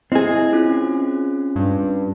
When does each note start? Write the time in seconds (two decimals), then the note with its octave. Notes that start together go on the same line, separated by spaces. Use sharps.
0.12 C4 E4 G#4 D#5
0.53 C#4 F4
1.56 G2